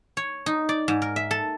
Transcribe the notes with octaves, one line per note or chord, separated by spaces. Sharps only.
C#5
D#4
D5
G#2
A#4
E5
A4